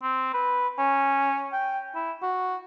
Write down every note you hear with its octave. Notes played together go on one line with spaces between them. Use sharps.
C4
B4
C#4
G5
E4
F#4